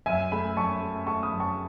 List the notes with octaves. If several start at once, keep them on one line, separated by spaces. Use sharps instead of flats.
F#2 E5 G#5
A3 G#5 B5
F#2 A5 C#6
A3
A3 A5 C#6
B5 D#6
F#2
A5 C#6